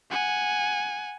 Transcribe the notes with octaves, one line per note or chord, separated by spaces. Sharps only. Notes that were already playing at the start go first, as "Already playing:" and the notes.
F#5 G#5